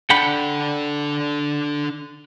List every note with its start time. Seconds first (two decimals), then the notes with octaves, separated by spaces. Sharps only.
0.10 D4 A4 F#5 G5 B5